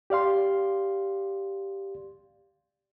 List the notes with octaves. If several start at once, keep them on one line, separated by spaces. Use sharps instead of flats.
G4 D5 F5 C6